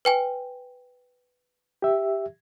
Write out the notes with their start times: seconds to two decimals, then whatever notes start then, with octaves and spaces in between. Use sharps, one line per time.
0.05 B4 G5 G#5
1.82 G4 E5